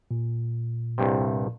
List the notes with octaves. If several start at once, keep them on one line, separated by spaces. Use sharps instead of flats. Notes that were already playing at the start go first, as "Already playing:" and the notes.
A#2
C2 G2 C3